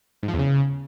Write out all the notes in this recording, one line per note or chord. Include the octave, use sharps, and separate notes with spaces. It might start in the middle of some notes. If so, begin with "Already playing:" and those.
G#2
F3
E2
C#3